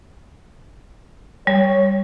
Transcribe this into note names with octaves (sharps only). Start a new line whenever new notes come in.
G3 C#5